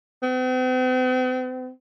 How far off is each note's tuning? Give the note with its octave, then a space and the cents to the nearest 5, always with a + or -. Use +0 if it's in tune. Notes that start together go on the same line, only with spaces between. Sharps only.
C4 -45